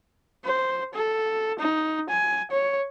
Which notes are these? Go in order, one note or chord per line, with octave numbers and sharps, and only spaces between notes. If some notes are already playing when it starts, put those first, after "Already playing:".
C5
A4
D#4
G#5
C#5